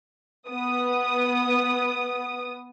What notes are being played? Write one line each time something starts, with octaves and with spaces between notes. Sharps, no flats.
B3 D#6